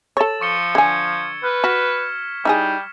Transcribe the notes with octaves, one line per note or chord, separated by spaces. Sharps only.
A4 C#5 E6 A6 E7
F3 C#6 C#7 G7
D3 G#5 G#6 C#7
B4 F6
F#4 F6 B6 E7
G3 D#4 E4 G#4